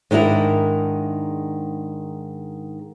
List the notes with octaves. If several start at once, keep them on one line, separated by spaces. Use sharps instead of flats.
G#2 D#3 D4 E4 A#4